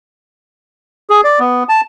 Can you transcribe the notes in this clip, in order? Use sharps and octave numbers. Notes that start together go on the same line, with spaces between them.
G#4
D5
B3
A5